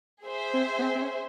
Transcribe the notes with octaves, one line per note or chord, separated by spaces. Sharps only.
G#4 C5 E5
C4
B3
C4
C4
C#4